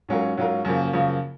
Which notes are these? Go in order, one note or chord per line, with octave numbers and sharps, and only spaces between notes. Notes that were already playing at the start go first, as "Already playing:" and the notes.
G#2 F#3 C#4 F4 A#4
G#2 F#3 C#4 F4 A#4
F#2 C#3 F3 A#3
F#2 C#3 F3 A#3